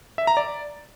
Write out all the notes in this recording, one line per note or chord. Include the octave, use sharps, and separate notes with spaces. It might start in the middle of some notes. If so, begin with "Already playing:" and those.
E5
A#5
D5